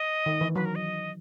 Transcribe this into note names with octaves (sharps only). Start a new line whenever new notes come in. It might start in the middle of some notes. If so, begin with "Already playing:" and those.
Already playing: D#5
D#3
E3
F#3 B4
A#4
D#5